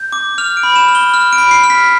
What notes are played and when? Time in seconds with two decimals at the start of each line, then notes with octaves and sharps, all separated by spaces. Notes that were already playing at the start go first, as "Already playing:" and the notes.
Already playing: G6
0.12 D6
0.38 F6 F7
0.57 D7
0.63 B5
0.76 E7
0.88 F6
0.95 G7
1.14 F6
1.33 D7
1.38 B5
1.51 C7
1.64 F6
1.70 B6